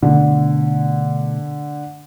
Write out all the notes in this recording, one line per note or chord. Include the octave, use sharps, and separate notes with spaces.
B2 D3 A3